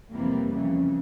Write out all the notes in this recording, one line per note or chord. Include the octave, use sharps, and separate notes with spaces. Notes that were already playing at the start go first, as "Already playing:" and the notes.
F2 C3 E3 G3 A#3
F2 C#3 E3